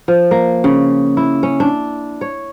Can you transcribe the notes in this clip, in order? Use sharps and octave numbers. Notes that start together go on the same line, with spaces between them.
F3
A#3
C#3
E4
C#4
D4
C#5